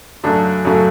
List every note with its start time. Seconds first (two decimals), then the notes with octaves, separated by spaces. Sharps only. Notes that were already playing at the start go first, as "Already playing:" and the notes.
0.24 F#2 C#3 F#3 A3 D4
0.65 F#2 C#3 F#3 A3